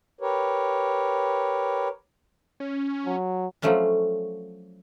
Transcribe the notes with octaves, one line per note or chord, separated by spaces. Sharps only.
G4 A#4 B4 C#5
C#4
F#3
F3 F#3 A3 C#4 D4